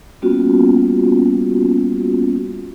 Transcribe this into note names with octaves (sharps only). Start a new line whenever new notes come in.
G3 A#3 B3 C#4 F4 F#4